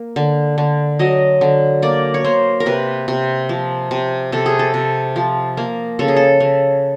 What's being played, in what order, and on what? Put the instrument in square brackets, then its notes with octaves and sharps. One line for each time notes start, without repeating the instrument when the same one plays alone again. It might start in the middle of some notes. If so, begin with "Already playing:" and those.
Already playing: [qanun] A#3
D3
D3
F#3 D#5
D3
A#3 D5
C#5
A#3 C5
A#4
C3 B4
C3
F3
C3
C3 A4
G#4
A4
C3
F3
A#3
C#3 A4
G#4
A4
C#3